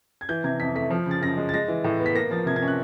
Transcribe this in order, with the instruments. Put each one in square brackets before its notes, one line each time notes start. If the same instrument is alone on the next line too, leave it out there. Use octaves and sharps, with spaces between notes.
[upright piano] G#6
E3 G6
C3 G#6
F2 B6
A3 B6
F3
C#3 A6
F#2 A#6
G#3
A6
G#3 A#6
E3
A2
B3
B6
A#3 A#6
F3 A6
C3 G#6
G#6
C#4
F#6